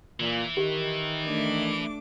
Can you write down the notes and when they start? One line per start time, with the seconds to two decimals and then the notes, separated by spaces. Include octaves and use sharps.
0.20 A#2 E3
0.57 D#3 G4
1.24 A3 D4 D6